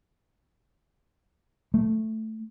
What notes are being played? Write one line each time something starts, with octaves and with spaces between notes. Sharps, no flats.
A3